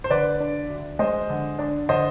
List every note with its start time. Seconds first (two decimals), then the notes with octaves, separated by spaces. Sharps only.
0.04 C5
0.10 D3 B4 D5
0.40 D4
0.69 D2
0.99 G#3 C5 D#5
1.30 D3
1.59 D4
1.89 D3 C5 D#5